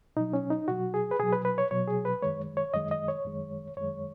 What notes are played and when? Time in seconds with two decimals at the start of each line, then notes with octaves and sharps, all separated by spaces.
0.16 B2 F#3 D#4
0.33 C#4
0.50 D#4
0.68 B2 F#3 F#4
0.94 G#4
1.11 B4
1.19 B2 F#3 G#4
1.33 B4
1.45 B4
1.58 C#5
1.71 B2 F#3 C#5
1.87 G#4
2.05 B4
2.22 F#2 D#3 G#3 C#5
2.57 C#5
2.74 F#2 D#3 G#3 D#5
2.91 D#5
3.08 C#5
3.25 F#2 D#3 G#3
3.77 F#2 D#3 G#3 C#5